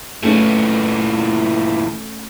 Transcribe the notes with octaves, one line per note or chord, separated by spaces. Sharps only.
A#2 E3 A3 C#4